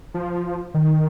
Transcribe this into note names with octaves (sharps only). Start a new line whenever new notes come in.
F3
D#3